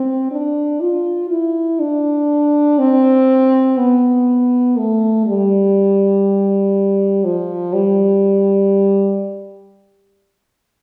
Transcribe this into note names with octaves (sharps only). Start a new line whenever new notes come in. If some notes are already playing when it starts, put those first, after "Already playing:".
Already playing: C4
D4
F4
E4
D4
C4
B3
A3
G3
F3
G3